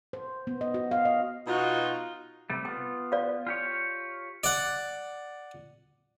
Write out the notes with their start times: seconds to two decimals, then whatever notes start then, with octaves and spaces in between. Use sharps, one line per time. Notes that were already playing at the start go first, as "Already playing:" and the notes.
0.13 C5
0.47 B3
0.61 D#5
0.74 F#4
0.91 F5
1.05 D#5
1.47 B2 D#4 F4 F#4
2.50 C3 G3 A3
2.65 B3 F4 G5
3.12 D5 F5
3.47 F4 G4 C#5
4.44 D5 F#5